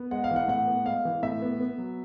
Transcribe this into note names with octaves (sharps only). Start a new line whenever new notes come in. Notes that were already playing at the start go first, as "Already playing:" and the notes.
Already playing: B3
G#3 F#5
F5
E3
F#5
A2 F#5
B3
G#3 F5
E3
A2 E5
B3
B3
F#3